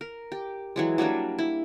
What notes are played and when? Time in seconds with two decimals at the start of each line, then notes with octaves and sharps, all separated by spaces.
0.01 A#4
0.32 G4
0.76 E3 F#3 G#3
0.98 F#3 G3 A#3 D4
1.38 E4